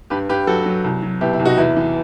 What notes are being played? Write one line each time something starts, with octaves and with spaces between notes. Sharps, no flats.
G2 G4 B4
G2 G4 B4
F#3 F#4 A4
F#3
C2
F#3
B2 E4 G4
E4
C2
D#4 F#4
E2 E4
E3